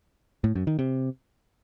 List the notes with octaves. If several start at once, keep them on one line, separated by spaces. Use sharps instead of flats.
A2
F#2
D#3
C3